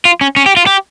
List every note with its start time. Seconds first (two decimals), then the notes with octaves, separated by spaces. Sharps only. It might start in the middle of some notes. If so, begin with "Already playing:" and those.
0.05 F4
0.21 C#4
0.36 C#4
0.46 G4
0.57 F4
0.67 G4